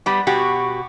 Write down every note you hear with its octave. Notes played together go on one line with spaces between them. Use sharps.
G3 B3
B2 F#4 G4